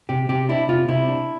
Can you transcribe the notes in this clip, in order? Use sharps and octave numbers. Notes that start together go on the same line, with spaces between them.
C3 G4
C3 G4
D4 E4
C3 F4
C3 E4
D4